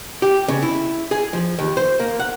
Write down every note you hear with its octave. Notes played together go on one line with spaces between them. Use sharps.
G4
C#3
E4
G#4
F3
D#2
C5
A#3
F#5